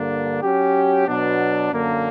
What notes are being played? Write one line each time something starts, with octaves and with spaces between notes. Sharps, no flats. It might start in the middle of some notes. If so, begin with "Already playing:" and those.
Already playing: G2 D3 A#3 D4
F#3 C#4 G4
B2 F#3 B3 D4
F#2 D3 A#3 D4